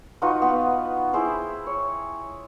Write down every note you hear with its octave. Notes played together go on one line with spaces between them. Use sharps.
D#4 F4 F#4 B4
B3
E4 G#4 C5 G5
C#5